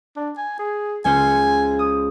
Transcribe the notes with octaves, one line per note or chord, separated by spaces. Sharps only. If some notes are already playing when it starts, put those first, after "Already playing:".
D4
G#5
G#4
C#2 C#4 C5 G#5
D#6